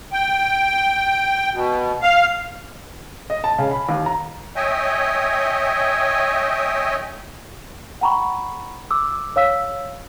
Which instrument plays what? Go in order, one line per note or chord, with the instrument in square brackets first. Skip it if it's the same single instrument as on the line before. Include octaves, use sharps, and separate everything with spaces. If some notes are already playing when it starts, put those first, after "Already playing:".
[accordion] G5
B2
F5
[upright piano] D#5
A5
C#3
B5
D#2
A#5
[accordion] C#5 D#5 E5 G5 G#5
[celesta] F#5 G5 A#5 B5 C#6
D6 E6
C#5 F5 E6 B6